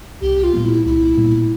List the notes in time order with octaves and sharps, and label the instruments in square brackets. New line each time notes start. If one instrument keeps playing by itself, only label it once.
[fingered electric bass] C2 [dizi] G4
[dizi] F4
[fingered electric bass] A#2 G3 B3
[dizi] E4
[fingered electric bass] C2 [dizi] E4
[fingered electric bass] A#2 G3 B3